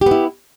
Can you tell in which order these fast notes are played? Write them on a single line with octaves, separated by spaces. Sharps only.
G4 B3 E4